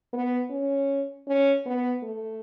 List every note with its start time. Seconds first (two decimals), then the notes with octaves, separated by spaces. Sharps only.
0.13 B3
0.50 C#4
1.28 C#4
1.66 B3
2.03 A3